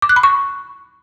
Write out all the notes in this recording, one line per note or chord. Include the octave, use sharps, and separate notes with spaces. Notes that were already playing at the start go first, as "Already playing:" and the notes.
D6
F#6
B5
C#6